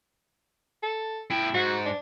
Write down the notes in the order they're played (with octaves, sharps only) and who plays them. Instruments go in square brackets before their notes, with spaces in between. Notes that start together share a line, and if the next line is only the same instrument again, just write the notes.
[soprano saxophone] A4
[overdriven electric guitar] A3 G5 [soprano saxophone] E4
[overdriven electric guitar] G#2 [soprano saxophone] F#4
[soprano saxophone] D4